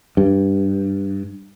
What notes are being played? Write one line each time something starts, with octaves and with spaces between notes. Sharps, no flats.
G2